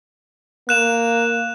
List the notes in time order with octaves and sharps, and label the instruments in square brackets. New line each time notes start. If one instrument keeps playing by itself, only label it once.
[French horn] A#3 [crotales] F#6 E7 F7